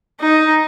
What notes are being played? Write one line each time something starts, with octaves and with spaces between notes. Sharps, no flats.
D#4